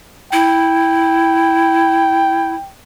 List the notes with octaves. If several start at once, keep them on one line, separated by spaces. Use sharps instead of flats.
E4 G5